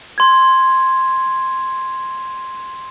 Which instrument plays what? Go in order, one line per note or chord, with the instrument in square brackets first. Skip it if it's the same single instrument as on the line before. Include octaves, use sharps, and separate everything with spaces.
[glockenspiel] C6 G#6